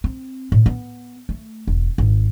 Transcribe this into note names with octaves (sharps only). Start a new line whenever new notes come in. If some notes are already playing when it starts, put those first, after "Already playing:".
C4
A2
B3
A3
E1
G#1